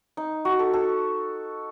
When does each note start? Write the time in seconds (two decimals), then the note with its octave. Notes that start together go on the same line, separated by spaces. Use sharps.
0.17 D#4
0.45 F#4
0.59 A4
0.73 A4